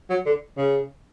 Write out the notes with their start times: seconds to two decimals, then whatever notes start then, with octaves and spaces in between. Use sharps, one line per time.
0.10 F#3
0.26 D3
0.57 C#3